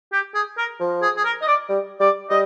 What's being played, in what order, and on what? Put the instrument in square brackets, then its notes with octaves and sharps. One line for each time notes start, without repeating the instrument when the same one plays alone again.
[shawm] G4
G#4
A#4
[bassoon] F3
[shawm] G#4
G#4
A#4
D#5
D5
[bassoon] G3
[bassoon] G3 [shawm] D5
[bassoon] G3 [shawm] D#5